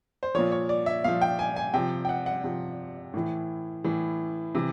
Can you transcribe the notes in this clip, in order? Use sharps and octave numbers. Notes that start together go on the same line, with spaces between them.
C5
A#2 F3 C#5
C#5
D5
E5
A#2 F3 F5
G5
G#5
G#5
C3 F3 G5
G5
F#5
F#5
C3 F3
A2 E3
A2 E3
C3 E3